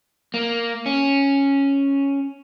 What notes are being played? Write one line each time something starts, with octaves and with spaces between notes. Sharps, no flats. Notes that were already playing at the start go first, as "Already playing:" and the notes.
A#3
C#4